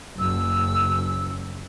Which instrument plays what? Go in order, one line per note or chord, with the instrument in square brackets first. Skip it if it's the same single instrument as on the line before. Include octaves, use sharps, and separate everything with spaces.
[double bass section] F#1 [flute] E6